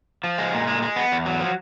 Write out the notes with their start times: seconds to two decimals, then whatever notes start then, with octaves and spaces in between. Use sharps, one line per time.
0.24 F3
0.38 G#3
0.54 A#2
0.67 G#3
0.82 G#3
0.96 B3
1.12 E2
1.26 F#3
1.40 F3